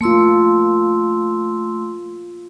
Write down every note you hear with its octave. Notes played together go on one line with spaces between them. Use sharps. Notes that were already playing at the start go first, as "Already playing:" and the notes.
A3 A#3 F4 C6 E6